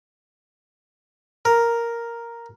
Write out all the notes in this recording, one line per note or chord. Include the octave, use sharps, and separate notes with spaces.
A#4